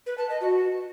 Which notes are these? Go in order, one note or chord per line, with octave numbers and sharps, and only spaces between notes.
B4
A5
D#5
F#4